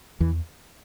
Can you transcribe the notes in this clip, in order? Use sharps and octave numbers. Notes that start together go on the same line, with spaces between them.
E2 E3